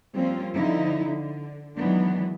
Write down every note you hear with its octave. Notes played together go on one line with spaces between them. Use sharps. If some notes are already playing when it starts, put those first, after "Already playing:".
F3 G3 A#3 C4 C#4 F4
D3 F3 D#4 E4
D3
D#3 E3 F#3 G#3 B3 D4